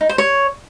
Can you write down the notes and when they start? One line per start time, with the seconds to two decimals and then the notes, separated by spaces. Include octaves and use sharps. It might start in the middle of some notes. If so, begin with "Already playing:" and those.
0.01 D#4
0.09 C5
0.18 C#5